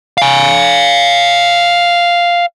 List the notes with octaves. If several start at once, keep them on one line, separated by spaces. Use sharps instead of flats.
F5 G#5